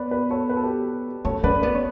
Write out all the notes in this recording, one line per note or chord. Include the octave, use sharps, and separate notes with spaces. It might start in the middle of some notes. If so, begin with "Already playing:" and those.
Already playing: B3 B4 C#5 D5
B4 D5
A4 C#5
B4
A4
G4 B4
C#4 A4 C#5
C#4 B4 D5
B3 B4 D5
C#5